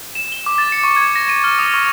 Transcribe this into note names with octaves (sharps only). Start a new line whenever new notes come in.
E7
G7
D6
A6
C#7
C#6
G#6
A#6
D#7
F6
D#6
C#6